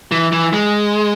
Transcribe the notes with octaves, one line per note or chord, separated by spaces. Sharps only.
E3
E3
G#3